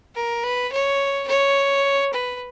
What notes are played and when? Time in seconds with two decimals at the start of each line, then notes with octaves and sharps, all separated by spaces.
0.15 A#4
0.43 B4
0.72 C#5
1.27 C#5
2.13 B4